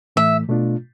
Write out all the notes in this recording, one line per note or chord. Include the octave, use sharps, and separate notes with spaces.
A2 E3 A3 E5
B2 A3 D4 F4